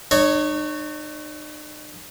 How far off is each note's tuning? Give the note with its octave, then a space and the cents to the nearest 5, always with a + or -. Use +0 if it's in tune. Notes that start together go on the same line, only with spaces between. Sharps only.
D#4 -45 C#5 +0